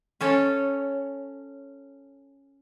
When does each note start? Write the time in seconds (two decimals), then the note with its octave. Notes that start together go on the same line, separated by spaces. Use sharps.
0.21 C#4 A4 C#5